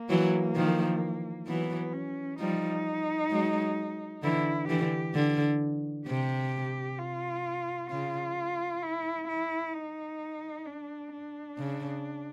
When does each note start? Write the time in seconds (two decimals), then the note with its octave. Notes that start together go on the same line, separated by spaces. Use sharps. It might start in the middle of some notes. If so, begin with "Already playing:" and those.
Already playing: A#3
0.10 E3 F#3
0.56 D#3 F3
1.47 E3 F#3 B3
1.93 C#4
2.39 F3 G3 D#4
3.31 F#3 G#3
4.23 D3 E3 E4
4.69 D3 E3 G4
5.14 D3
6.07 C3 G4
6.99 F4
7.90 C#3 F4
8.82 E4
9.28 E4
9.74 D#4
10.66 D4
11.12 D4
11.58 C#3